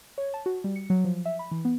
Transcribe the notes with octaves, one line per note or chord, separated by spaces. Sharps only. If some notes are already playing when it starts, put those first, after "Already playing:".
C#5
A5
F#4
G3
C#7
F#3
F3
E5
B5
E3
B3